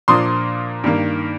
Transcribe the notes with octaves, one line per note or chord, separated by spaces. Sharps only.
A#2 F3 A#3 D4 C6 D#6
G2 D#3 A#3